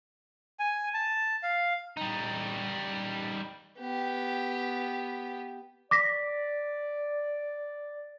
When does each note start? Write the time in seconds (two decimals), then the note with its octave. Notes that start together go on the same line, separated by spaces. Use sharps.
0.59 G#5
0.94 A5
1.43 F5
1.97 G3 D#4
3.79 B3 G4
5.91 D5 D6 A#6 B6